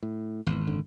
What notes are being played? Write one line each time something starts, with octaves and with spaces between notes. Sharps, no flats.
A2
G#1 E2
F#1 D3